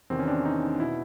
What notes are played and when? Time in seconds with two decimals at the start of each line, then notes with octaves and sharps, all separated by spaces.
0.10 E2 C3 D#3 C4
0.19 C#4
0.28 D4
0.45 D#4
0.80 B2 E4